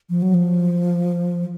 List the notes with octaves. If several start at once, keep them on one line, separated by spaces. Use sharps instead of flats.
F3
F#3
F3